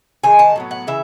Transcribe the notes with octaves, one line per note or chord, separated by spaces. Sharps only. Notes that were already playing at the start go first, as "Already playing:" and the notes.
D#3 G#3 G#5
A5
A2 F#3 B3
F#5
C#3 E3 E5